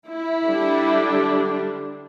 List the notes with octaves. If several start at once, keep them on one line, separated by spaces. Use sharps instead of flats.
E4
D3 G3 D4